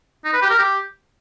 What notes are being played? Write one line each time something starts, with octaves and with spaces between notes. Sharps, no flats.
D#4
B4
G4
A#4
G4